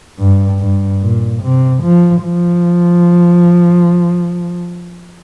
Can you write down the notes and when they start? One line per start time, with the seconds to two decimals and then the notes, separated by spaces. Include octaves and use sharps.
0.19 G2
0.60 G2
1.01 A#2
1.42 C3
1.83 F3
2.24 F3